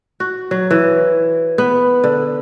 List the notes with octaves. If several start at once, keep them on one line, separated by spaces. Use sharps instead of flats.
F#4
F#3
E3
B3
D3